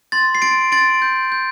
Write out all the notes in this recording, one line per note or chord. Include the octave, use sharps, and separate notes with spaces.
C6 A6
C7
C6 A6 D7
C6 A6 D7
G6
G6